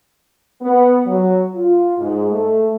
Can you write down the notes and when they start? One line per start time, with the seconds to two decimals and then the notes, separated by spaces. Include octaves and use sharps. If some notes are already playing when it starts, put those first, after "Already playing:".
0.62 B3
1.07 F#3
1.55 F4
1.99 G#2
2.31 A3